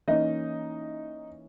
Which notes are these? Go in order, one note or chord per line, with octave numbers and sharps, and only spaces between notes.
E3 A#3 C#4 D#4 D#5